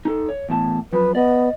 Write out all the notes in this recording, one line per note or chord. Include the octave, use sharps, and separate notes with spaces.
D#4 A4
C#5
E2 A2 A5
F#2 F3 B4
B3 D5 D#5